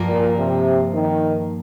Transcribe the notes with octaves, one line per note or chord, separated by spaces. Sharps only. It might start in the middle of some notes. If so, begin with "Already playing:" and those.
Already playing: G2 F3 A#3
A#2
C3
D#3